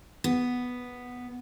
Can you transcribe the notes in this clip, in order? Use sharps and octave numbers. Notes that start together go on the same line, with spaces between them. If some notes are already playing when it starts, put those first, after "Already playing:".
B3